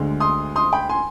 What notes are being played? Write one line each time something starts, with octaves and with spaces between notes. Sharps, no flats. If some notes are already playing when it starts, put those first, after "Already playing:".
Already playing: D2 D3 G#3
C6 D#6
C6 D#6
G5 B5
G#5 C6